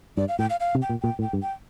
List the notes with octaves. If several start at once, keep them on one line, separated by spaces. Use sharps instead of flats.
G2 D5
F5
A2 G5
F5
F5
C3
G5
A#2
A#2 G5
A2
G5
G2
G5